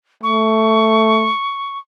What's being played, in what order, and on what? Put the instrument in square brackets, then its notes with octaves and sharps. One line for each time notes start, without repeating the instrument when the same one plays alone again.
[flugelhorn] A3 [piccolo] C#6